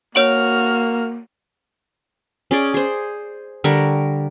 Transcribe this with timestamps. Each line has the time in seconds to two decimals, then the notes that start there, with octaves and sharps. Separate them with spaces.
0.15 A#3 F#4 C#5 F6 D7 F#7
2.51 C#4 G#4 D5
2.74 G#4 C5
3.64 D3 G3 A#4 C#6